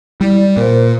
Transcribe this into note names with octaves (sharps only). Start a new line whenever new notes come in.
G3 E4 D5
D5
A#2 A#4 C5